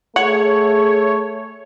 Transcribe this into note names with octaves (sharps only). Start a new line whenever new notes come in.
A3 G#4 C#5 F#5